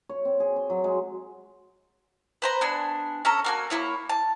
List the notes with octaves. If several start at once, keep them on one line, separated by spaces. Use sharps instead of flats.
C#5
C4
G#4
C6
F#3
G#3
B4 C5 A#5
B3 D4 G#5
C#4 A4 A#5
A#3 F#4 G#5
A#3 C4 E4 C#5
A5